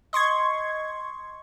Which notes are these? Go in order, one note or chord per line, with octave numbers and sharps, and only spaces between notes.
D#5 C6 C#6 G#6